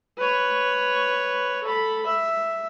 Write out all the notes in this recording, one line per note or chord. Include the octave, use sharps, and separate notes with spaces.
B4 C#5
A4 B5
E5